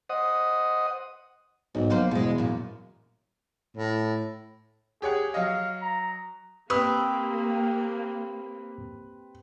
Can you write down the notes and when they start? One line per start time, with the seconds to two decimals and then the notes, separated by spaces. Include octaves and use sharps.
0.10 C5 D#5 F#5 D#6
1.75 B1 G#2
1.90 F#3 A#3 C5
2.11 E2 B2 G#3
2.38 F#2 A#2
3.77 A2
5.02 G4 G#4 C#5 F#5
5.34 F#3 D#5 F5
5.82 A#5
6.70 A#3 C4 G4 B4 C#6 D#6 E6